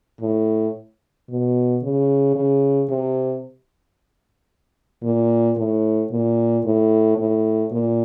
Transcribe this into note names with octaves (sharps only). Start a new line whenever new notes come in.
A2
B2
C#3
C#3
C3
A#2
A2
A#2
A2
A2
A#2